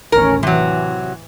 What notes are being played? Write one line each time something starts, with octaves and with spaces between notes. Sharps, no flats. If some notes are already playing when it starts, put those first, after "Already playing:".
A1 D#2 C#4 A#4
C3 E3 F#3